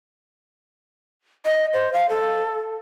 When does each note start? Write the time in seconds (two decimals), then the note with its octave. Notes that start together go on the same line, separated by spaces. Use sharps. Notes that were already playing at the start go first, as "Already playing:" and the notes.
1.45 D#5
1.73 C5
1.93 F5
2.09 A4